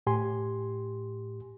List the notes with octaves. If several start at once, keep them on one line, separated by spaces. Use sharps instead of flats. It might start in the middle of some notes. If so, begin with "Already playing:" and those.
A2 G4 G#5 C6